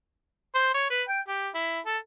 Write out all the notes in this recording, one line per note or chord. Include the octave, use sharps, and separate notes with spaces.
C5
C#5
B4
G5
G4
E4
A4